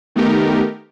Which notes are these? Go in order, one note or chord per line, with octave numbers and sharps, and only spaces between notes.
D#3 A3 B3 D#4 G4 A#4